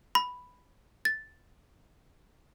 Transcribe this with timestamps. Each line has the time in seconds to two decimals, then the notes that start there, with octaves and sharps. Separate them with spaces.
0.15 B5
1.05 A6